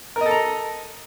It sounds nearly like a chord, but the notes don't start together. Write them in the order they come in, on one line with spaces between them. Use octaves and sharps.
A#4 D#5 A4 A#5